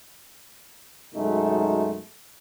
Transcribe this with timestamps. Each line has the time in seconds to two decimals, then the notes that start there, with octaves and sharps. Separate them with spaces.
1.14 F#2 B2 G#3 A3 D#4